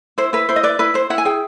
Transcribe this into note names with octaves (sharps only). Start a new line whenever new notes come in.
E4 C5
E4 B4
E4 C5
D#5
B4 D5
E4 B4
E4 C5
E4 F#5
G#5
G#4 G5